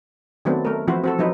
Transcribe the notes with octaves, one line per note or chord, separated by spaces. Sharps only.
D#3 F#3 A3 B3 C4 D4
A3 A#4
E3 F3 C4 E4 F#4 C5
C4 F#4 A4
F3 F#3 D#4 B4